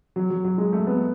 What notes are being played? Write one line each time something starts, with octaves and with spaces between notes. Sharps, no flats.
F#3
F#3
F#3
G#3
A3
B3